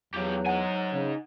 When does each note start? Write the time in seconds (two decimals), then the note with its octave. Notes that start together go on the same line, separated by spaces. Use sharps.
0.14 E2 F3 F#3 G4
0.46 D#4 F#5 G#5
0.91 C#3